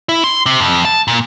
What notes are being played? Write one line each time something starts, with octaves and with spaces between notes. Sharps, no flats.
E4
C6
C3
F2
A5
A#2